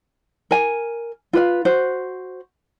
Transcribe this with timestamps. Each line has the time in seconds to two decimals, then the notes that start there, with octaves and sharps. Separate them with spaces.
0.51 A#4 G#5
1.33 F4 B4 F5
1.65 F#4 C5